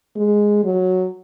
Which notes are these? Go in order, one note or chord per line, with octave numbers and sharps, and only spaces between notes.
G#3
F#3